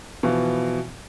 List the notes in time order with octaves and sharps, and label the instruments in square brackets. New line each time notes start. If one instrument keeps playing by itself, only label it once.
[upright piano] B2 E3 F3